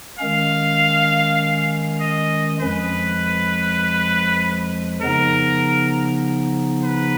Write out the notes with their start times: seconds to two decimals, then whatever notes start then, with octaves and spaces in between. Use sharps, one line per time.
0.19 D#3 G#3 C#4 F5
2.00 D#5
2.60 F2 F3 G#3 B4
5.02 C#3 F3 B3 D#4 A#4
6.84 B4